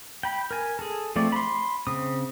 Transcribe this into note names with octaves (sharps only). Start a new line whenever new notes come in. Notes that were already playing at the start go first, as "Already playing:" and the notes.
G5 B5
A#4 G#5
G#4 A4
F3 A3 C4 D5
B5 C6
C#3 C4 D#6